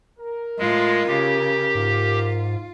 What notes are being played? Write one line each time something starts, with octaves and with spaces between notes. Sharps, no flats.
A#4
A2 G#3 F4
C#3 G4
G#2 F4